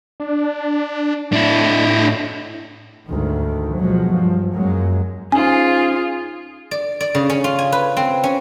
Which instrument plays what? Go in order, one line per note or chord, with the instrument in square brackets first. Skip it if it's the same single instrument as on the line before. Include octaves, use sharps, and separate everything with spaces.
[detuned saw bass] D4
[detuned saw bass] A2 [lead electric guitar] D4 E4
[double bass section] D2 G#2 D#3
B2 F3 F#3 G#3
G2 F3
F#2 F#3 G#3 A#3
[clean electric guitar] C#4 D#4 C5 [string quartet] F4 G#4 [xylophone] G#5
[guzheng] D5
D5
C#3
C#4
F4
G#5
B4
C4
C#4